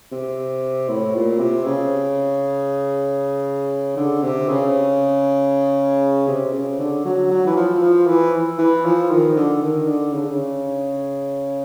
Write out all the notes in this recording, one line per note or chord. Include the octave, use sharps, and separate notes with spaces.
C3
A2
A#2
C3
C#3
D3
C3
C#3
C3
C#3
D3
F#3
F#3
E3
F3
F3
E3
E3
F3
D#3
D3
D#3
D3
C#3
D3
C#3